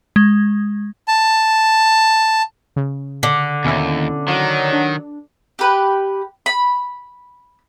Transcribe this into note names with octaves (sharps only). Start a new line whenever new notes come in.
G#3
A5
C#3
D3
D#2 B2 C#4 E4
D#3 F#3
D4
G4 B4
B5